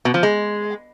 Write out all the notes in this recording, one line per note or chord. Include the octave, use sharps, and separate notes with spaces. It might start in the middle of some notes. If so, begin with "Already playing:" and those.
B2
F3
G#3